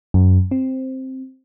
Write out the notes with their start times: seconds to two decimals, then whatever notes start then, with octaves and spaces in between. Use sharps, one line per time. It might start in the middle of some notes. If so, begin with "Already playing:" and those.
0.14 F#2
0.51 C4